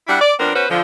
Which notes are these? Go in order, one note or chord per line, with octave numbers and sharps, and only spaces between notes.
G3 D4 E4 F#5
D5
F3 B3 C4 D4 A#4
B3 C#4 F#4 B4 C5
D3 F3